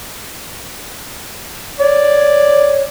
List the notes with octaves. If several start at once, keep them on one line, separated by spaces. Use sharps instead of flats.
C#5 D5